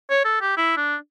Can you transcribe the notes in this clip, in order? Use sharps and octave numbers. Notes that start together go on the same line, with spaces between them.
C#5
A4
G4
E4
D4